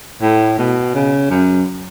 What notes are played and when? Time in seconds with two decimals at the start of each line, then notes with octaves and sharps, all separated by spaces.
0.22 A2
0.58 B2
0.95 C#3
1.30 F#2